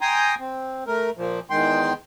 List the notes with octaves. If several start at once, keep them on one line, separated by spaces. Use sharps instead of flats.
G5 G#5 A#5 C6 D#6
C4
A3 A#4
A#2 F3
E2 D#3 G#3 G5 C6